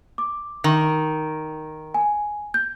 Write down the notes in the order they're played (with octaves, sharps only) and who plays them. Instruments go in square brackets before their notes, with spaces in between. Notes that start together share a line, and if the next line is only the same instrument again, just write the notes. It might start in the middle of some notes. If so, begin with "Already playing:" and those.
[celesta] D6
[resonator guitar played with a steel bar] D#3
[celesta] G#5
G6